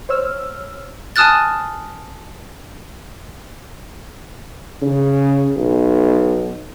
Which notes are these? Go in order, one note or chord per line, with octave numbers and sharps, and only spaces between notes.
C5 C#5 E6 F6
G#5 A5 D#6 F6 F#6 A6
C#3
B1